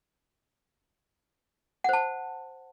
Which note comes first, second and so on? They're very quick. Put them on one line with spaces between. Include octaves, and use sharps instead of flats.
F#5 C5 A5